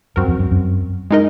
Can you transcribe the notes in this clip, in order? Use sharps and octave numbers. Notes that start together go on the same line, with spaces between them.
F#2 C4 F#4 A#4
F2
F#2
F#2
G#3 D#4 A#4 D#5